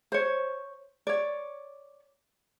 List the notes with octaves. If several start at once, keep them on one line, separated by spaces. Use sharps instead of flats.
C5 C#5
C#5 D5